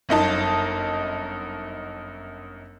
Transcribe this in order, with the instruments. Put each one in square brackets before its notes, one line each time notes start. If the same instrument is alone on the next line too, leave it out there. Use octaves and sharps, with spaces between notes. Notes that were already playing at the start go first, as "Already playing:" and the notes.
[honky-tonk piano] G1 F#2 D#4 A5